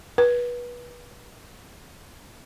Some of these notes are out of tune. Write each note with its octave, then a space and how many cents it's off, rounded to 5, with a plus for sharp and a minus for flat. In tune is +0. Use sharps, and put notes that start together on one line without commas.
B4 -25